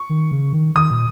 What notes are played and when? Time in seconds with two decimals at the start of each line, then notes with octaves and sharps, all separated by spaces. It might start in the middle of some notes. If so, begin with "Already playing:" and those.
Already playing: C#6
0.09 D#3
0.31 C#3
0.53 D#3
0.75 D#3 D#6
0.90 A#2